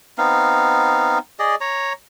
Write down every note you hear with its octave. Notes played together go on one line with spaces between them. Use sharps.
B3 C4 D#4 F5
G#4 D5 D#5
C#5 A#5